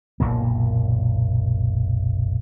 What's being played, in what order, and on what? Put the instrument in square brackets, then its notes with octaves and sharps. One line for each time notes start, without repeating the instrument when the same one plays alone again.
[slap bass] F#1 B1 A#2 A#3